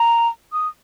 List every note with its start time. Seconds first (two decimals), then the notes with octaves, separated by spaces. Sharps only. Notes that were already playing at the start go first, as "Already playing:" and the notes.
Already playing: A#5
0.53 D#6